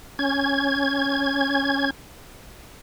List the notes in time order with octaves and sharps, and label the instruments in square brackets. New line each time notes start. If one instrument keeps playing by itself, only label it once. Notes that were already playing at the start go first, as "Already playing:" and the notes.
[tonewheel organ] C#4 G#6